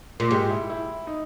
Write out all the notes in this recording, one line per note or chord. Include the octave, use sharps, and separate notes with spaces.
A#2
G#2 G4
E4
E4
D#4